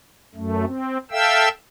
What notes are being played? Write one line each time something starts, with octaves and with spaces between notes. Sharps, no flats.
F#2 A3
C4
A4 E5 F5 G5 E6